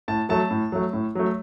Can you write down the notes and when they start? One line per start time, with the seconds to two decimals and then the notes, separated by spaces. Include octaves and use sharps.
0.08 A2 A5
0.29 F#3 A3 A5
0.51 A2
0.72 F#3 A3
0.93 A2
1.15 F#3 A3